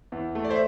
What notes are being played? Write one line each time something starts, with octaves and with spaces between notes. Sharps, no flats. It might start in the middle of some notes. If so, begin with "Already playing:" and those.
E2
A3
D5
C5 E5